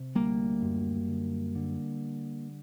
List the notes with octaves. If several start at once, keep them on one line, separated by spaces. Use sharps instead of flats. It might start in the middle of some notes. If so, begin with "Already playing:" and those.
Already playing: C3
D2 G3 A#3
F#2
D3
D3